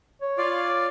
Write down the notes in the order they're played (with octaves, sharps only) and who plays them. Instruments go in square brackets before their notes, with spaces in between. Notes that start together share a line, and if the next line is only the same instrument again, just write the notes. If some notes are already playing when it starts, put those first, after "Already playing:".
[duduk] C#5
[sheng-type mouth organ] F4 D5 F5